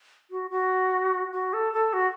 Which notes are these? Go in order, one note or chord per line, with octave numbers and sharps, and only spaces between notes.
F#4
F#4
F#4
A4
A4
F#4